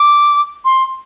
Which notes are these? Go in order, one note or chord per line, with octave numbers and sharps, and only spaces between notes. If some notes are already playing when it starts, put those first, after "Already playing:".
Already playing: D6
C6